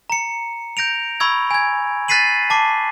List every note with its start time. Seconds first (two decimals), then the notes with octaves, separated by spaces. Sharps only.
0.10 A#5 C#7
0.77 G6 A#6 D7 F7
1.20 B5 C#6 E6 G#6
1.51 G#5 G#6
2.08 F#6 A6 B6 C7 D#7 F#7
2.50 A5 D6 C7